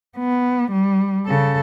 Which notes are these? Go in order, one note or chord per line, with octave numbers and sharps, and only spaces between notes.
B3
G3
C#3 A4